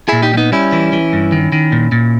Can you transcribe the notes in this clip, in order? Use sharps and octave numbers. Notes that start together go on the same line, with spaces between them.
A#2 E4 G#4
D#4 G4
G3
B3 D#4
G3 C#4 E4
E3
E3
G2
D#3
D#3
A#2
A#2